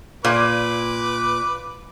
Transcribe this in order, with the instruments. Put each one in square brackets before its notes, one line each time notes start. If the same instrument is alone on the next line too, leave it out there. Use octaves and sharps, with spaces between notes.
[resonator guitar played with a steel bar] A#2 [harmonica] B4 D6